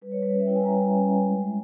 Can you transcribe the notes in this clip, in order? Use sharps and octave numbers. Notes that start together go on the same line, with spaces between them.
G3 B4
G3 C#5
B4
C#4
E5
E4 G5
G#5
G3 A#5
G3
C#4
E4
G#3
G#3